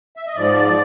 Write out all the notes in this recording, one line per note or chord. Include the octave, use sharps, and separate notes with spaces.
E5
D#5
G#2 F3 D5